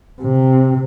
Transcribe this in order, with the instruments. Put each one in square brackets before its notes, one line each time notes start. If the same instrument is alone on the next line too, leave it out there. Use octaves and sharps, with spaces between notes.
[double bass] C3